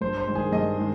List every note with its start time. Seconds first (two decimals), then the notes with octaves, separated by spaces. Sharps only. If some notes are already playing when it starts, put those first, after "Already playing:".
0.01 G2 C5
0.18 C5
0.27 D#3 G#3
0.35 G#4
0.52 G2 D#5
0.77 D#3 G#3